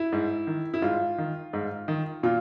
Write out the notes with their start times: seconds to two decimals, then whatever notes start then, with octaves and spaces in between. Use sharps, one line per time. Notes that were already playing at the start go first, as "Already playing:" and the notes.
Already playing: E4
0.12 G#2
0.47 D#3
0.74 E4
0.82 G#2 F4
1.18 D#3
1.53 G#2
1.88 D#3
2.23 A#2 F4